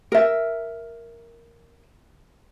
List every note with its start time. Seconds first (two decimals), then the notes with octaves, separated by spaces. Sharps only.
0.12 A#4 E5